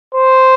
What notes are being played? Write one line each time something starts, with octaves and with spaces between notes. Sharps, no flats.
C5